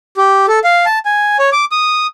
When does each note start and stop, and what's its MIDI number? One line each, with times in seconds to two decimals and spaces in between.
0.17 0.46 67
0.48 0.59 69
0.64 0.85 77
0.86 0.99 81
1.05 1.37 80
1.39 1.50 73
1.52 1.65 86
1.72 2.07 87